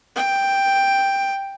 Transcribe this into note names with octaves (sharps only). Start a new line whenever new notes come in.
G5